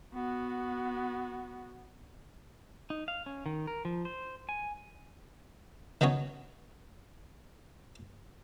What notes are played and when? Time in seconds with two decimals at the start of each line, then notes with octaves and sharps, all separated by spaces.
0.14 B3 F#4
2.90 D#4
3.08 F5
3.26 C#4
3.46 D#3
3.67 A#4
3.85 F3
4.05 C5
4.49 G#5
6.01 D#3 F#3 B3 C#4 C#5